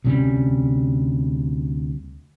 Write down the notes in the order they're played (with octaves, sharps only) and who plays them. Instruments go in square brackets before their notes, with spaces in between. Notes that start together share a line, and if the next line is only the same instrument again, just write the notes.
[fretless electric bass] D2 C3 G3 C#4